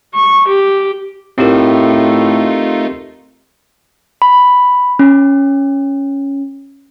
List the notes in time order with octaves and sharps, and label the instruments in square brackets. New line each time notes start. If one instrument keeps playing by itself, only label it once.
[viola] C#6
G4
[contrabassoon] A2 [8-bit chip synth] A3 D#4 F4 [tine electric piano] C4 G4 A#4
[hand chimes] B5
C#4